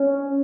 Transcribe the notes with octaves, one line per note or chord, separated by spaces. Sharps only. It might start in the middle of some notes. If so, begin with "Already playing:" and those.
Already playing: C#4